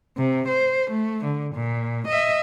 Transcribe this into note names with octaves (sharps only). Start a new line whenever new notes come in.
C3
C5
A3
D3
A#2
D#5 E5